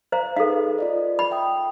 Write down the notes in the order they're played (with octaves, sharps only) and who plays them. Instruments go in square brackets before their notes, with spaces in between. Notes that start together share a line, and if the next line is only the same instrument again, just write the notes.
[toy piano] C5 F5 A#5
[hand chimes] D#4 G#4 B4 [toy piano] A4 F5
[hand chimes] F4 D5 D#5
[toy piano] B5
[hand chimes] E5 G5 D#6